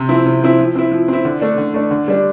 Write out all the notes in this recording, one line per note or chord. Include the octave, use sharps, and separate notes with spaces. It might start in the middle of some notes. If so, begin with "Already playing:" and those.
Already playing: C3
F3 C4 E4
C3
F3 C4 E4
F3
C4 E4
F3
C4 E4
D3
A3 D4
D3
A3 D4
D3
G3 D4